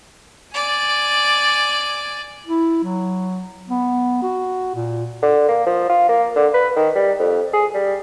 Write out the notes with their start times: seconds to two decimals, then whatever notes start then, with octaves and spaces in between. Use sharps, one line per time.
0.54 D5 G#5
2.46 E4
2.83 F#3
3.70 B3
4.22 F#4
4.75 A#2
5.23 D3
5.49 A#3
5.66 F3
5.89 F4
6.09 A#3
6.36 D3
6.54 B4
6.76 D#3
6.95 G3
7.19 F2
7.53 G#4
7.74 G3